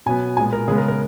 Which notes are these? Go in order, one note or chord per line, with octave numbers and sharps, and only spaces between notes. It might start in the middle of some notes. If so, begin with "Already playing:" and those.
B2 F#3 B3 G#5
A#2 G#3 B3 G#5
A#4
C#3 G#3 B3 G#4
A#4
A#4